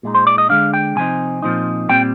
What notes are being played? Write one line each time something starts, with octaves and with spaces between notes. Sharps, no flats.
A#2 G#3 D#4
C5
D5
D#5
D3 G#3 D4 F5
G5
C3 F3 C4 D#4 G#5
A#2 F3 C4 D#4
A#2 G3 C4 G5